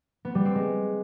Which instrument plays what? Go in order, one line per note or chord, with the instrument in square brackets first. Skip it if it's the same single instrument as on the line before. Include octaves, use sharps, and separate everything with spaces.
[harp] B3
G3
C4
G#3